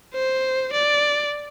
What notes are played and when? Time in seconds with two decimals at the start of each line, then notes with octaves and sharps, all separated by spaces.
0.14 C5
0.73 D5